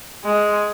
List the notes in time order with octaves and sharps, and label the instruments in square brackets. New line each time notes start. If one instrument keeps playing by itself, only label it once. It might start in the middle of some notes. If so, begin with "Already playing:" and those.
[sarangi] G#3